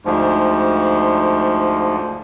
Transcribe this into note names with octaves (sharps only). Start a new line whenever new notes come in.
D2 G#2 F3